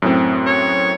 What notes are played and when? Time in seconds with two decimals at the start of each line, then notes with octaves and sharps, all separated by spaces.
0.02 F#2 A2 C4
0.46 C#5